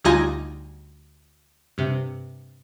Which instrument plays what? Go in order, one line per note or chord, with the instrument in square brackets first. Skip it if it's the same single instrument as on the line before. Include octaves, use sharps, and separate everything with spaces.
[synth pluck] D2 G3 D#4 F4 G#5 A#6
G2 C3